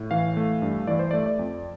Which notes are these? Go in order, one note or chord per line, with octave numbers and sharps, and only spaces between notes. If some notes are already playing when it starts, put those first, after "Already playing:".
Already playing: A2
E3 F5
A3
G2
E3 D5
C5
A3 D5
D5
F2